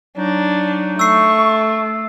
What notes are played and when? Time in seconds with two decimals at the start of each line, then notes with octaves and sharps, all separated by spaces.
0.18 F#3 D4 D#4
0.99 A3 C#6 E6 C7